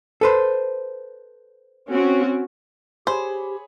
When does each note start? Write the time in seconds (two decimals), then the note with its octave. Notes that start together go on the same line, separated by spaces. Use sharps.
0.21 A4 B4 C5
1.91 C4 C#4 F#4
3.07 G4 G#4 C5 C#5 B5